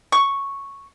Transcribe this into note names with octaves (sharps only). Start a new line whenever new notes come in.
C#6